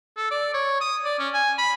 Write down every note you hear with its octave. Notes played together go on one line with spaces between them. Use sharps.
A4
D5
C#5
D#6
D5
C#4
G#5
B5